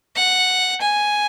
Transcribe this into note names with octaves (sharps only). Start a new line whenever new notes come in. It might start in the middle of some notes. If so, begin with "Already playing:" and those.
F#5
G#5